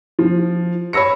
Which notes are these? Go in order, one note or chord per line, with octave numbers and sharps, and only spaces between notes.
F3
C#5 B5 E6 A#6 C#7